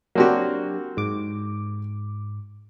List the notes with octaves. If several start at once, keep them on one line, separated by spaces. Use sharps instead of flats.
F#3 A#3 C4 D4 F#4 G4
G#2 D6